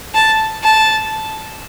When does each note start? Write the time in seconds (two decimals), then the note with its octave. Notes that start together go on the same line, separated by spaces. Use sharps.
0.15 A5
0.64 A5